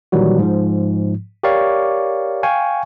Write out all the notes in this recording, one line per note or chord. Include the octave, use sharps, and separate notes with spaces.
A#2 D#3 E3 F#3 G3 F#4
G#2 F3
G4 A#4 C#5 D5 F5 C#6
F5 G5 G#5 C#6